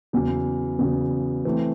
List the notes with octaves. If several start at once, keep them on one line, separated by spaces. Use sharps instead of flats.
E2 C#3 F#3
E2 C#3 F#3
E3 A3 C4